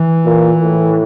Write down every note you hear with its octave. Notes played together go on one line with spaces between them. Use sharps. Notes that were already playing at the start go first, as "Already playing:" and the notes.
Already playing: E3
A#2
A2